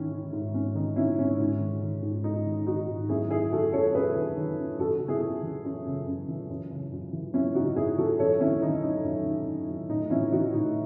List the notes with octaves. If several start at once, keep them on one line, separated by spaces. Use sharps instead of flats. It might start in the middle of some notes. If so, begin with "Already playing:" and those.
Already playing: G#2 D#3 C#4 E4
D#3
G#2
G#2 C#4
D#3 D#4
D#3 C#4 E4
G#2 C#4
G#2
D#3
D#3
G#2
G#2 D#4
D#3
D#3 D#4 F#4
G#2
F#2 E4 G#4
D#3 E4 G#4
D#3 F#4 A4
F#2 A4 C#5
F#2 G#4 B4
D#3
D#3
F#2
F#2 F#4 A4
C#3
E4 G#4
F#2
E3
F#2
C#3
F#2
E3
F#2
C#3
F#2
E3
F#2 C#4 E4
C#3 D#4 F#4
F#2 E4 G#4
E3 F#4 A4
F#2 A4 C#5
D#3 C#4 E4
D#3 D#4
F#2 D#4
F#2
D#3
D#3
F#2
A2 D#4
E3 C#4 E4
E3 D#4 F#4
A2 D#4